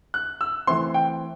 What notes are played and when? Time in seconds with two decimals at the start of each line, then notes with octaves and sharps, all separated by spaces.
0.14 F#6
0.41 E6
0.67 E3 A3 C4 C6
0.94 G5